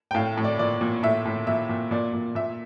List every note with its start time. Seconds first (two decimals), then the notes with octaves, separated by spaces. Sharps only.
0.11 G5
0.15 A2 F5
0.37 A2
0.44 D5
0.59 A#2 D5
0.81 A#2
1.03 A2 E5
1.25 A2
1.47 A#2 E5
1.69 A#2
1.91 A#2 D5
2.13 A#2
2.35 A#2 E5